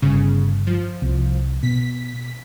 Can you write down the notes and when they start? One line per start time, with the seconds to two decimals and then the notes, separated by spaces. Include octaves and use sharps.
0.02 G1 C#3
0.67 F3
1.02 C2
1.63 B2 B6